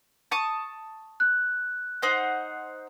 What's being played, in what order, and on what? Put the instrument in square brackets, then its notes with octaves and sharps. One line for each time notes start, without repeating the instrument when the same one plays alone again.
[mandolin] A5 C#6 D#6
[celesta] F#6
[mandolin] D#4 C5 F#5